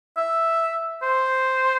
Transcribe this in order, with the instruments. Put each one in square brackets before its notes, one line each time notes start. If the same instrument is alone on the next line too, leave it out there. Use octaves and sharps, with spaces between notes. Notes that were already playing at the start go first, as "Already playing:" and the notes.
[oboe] E5
C5